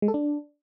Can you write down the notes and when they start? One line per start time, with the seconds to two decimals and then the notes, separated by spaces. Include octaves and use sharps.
0.02 G#3
0.08 A4
0.14 D4